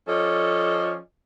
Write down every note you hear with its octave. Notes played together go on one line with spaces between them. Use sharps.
F3 C#4 A4 D5 D#5